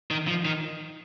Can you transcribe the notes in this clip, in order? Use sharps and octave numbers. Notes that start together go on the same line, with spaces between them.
D#3
F3
D#3